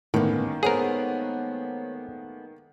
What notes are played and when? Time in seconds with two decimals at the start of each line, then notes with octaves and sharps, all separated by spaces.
0.14 G1 A2 D#3 G#3 A#3 B3 C#4
0.63 G#3 A3 B3 G#4 A#4 C5 C#5 F#5